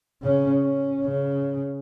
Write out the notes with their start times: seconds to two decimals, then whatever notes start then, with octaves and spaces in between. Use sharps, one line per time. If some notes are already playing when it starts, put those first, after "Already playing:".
0.22 C#3 C#4
0.63 C#4
1.05 C#3